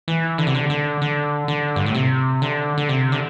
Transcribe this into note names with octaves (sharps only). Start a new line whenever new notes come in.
E3
D3
C3
D3
D3
D3
D3
G2
A2
C3
D3
D3
C3
D3